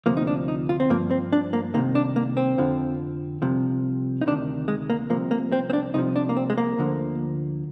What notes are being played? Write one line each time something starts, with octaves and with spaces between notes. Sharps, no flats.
D2 C3 F3 A#3
D#4
D4
D#4
F4
C4
G2 F3 A#3
C4
D4
A#3
C2 C3 D#3 A#3
D4
A#3
C4
F2 D3 F3
C2 C3 F3
D#4
D2 C3 D#3 D4
G#3
A#3
C2 C3 F3 A#3
A#3
C4
C4
D4
C2 C3 F3 D#4
D4
A#3
C4
G#3
A#3
D2 D3 F3